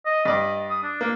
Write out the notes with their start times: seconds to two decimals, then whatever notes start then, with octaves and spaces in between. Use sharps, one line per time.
0.06 D#5
0.25 G2 D5 D#5
0.70 D#6
0.83 D4
1.01 A#3